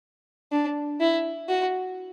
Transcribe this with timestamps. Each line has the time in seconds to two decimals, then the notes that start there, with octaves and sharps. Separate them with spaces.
0.52 D4
1.00 E4
1.48 F#4